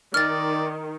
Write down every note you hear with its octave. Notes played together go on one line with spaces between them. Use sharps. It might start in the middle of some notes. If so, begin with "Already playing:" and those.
D#3 D5 F6 A6